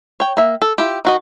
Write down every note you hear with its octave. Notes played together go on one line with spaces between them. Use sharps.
C#5 G5
A#3 E5
A4
E4 F4 G4
D#3 F#4 D#5